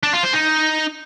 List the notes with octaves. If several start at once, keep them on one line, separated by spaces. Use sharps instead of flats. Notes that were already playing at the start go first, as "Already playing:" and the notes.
D4
F4
C5
D#4